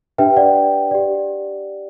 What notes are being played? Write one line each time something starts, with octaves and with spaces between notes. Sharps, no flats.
D4 G4 B4 E5 G5
D5 F#5
G4 D5